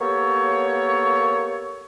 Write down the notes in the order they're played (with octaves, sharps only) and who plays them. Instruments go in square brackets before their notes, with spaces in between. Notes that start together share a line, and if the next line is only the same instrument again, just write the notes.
[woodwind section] A#3 B3 G4 A4 C#5